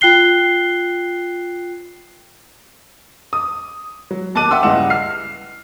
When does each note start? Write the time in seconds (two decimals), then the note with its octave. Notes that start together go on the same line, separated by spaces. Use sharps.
0.01 F4 G5 F#6 C7 G7
3.33 D#6
4.11 F#3
4.35 D#2 A5 D6 F#6 D#7
4.51 E5 F#5 G5 C6 D6 E6
4.63 C#2 G2 E4 D#5 F#5 E7
4.90 F6 C7